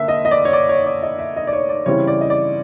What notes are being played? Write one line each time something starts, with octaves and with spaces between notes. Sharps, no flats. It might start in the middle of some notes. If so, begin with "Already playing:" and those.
Already playing: D3 A#3 E5
D#5
D#5
D5
C#5
D5
C#5
D5
D#5
E5
D#5
D5
C#5
D5
C#3 E3 G3 C4 E4 C#5
D5
D#5
D5